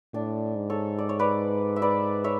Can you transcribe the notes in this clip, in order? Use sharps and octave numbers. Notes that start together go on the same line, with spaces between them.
A2 D4
G#2
A4 C#5
D5
C#5
B4 D5
E5
B4 D5
C#5 E5